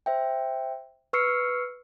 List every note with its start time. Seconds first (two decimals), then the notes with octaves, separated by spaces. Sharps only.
0.06 C5 E5 G5
1.13 B4 C#6 E6 F6 C7 C#7